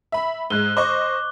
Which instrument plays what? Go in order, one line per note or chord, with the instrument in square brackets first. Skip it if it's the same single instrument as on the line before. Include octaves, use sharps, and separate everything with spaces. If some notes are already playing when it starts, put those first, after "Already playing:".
[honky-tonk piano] E5 B5
[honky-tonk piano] G#2 G#3 [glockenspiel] F#6 G7
[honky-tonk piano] C5 D#5 C#6 [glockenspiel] D6